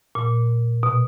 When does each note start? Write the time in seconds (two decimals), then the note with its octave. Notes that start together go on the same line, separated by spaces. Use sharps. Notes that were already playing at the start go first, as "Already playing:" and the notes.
0.15 A#2
0.83 B2